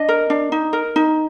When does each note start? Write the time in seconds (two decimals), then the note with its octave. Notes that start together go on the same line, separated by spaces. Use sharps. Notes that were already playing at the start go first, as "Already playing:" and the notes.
Already playing: D4 D#5
0.09 A#4
0.30 D4
0.52 D#4
0.73 A#4
0.96 D#4